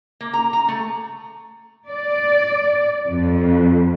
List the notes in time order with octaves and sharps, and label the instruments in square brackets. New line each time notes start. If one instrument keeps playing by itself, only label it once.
[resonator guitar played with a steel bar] A#3
A#5
A#5
A3
[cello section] D5
F2